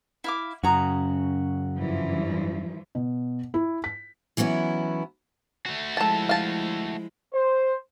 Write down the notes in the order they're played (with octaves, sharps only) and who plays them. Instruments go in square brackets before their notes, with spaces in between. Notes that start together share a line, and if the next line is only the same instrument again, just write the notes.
[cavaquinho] E4 F5 D6
[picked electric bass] F#2 [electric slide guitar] C#3 F#4 [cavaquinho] C#5 A#5 D#6
[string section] G2 E3 F3
[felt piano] B2
E4
B6
[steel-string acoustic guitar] E3 F#3 B3 C#4 E4
[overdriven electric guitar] A3 F#4
[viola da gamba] F3 G#3 E4 [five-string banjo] A4 A5
[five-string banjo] F5 A5
[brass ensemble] C5